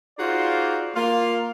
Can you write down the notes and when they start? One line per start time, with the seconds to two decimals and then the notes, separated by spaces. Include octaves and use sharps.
0.19 D#4 F4 F#4 G#4 C5 D5
0.95 A#3 F4 F5